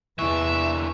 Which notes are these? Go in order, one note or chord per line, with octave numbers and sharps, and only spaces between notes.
E2 E3 D4 E5 G#5 C#6